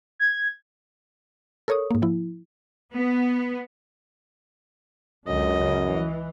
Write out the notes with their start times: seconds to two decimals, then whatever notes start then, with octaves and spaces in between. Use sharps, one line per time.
0.19 G#6
1.68 A4 A#4 C#5 C#6 D#6
1.91 G#2 A#3
2.02 F3 E4
2.95 B3
5.27 C#2 F#2 D3 D#5
5.59 C#3
5.88 E3